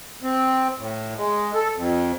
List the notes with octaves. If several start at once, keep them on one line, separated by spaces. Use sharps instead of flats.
C4
A2
G#3
A4
F2